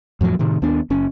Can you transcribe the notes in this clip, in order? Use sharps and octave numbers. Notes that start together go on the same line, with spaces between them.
F2 A2 F3 F#3
A2 C3 D#3
D#2 B3 D4
F#1 C#4